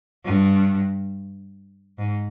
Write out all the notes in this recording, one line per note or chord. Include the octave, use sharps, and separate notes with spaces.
G2
G#2